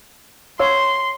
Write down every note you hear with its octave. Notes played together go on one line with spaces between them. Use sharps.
C#5 F5 C6 E6